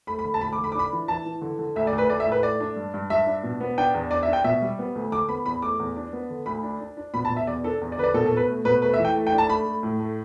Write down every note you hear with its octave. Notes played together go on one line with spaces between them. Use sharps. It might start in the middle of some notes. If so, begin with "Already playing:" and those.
A3 B5
B5
D3
A5
D2 B5
D6
D3
B5
D6
D4 B5
E3
E3 A5
E3
D3
D3
D2 E5
D5
D2
B4
A3 D5
E5
A2
B4
A3 D5
D4
G2
G2
G2 E5
D4
B2
B3
D4 G5
E2
D4 D5
E5
D4
G5
B2 E5
G3
B3
D2
D3 D6
B3 B5
E2 B5
A3 D6
E2
D4
B3
D3
D2 B5
D4
D4
D4
B2 B5
A5
B2
E5
E2 D5
D4 A4
E2
D5
D3 B4
D5
B2 A4
A4
B2
B4
A3
B2 B4
A3 B4
E5
E3
G5
A3
G5
D4
A5
A3 B5
A3
A2
A3